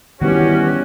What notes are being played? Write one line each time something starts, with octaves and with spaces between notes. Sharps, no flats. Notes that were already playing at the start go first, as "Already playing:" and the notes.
D#3 E3 G3 B3 C#4 F#4 G4